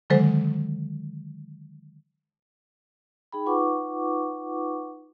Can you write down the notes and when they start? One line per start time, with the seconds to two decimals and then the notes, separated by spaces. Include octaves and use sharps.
0.10 D3 D#3 F#3 G#3 A4 C5
3.32 D#4 G#4 G5 B5
3.46 D#4 F4 B4 F#5 C#6 D6